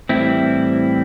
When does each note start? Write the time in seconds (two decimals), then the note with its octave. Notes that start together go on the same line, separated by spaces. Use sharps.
0.09 A2 E3 G3 C4 E4